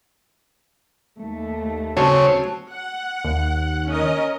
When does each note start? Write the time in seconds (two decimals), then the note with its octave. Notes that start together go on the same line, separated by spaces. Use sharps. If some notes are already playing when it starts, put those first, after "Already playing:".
1.20 D#2 A3
1.97 C#3 F#3 C4 C#5 A5
2.71 F#5
3.25 D#2
3.89 C#4 A#4 D#5